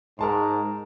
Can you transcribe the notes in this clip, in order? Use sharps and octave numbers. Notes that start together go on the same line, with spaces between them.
G#2 A#4 A5 C6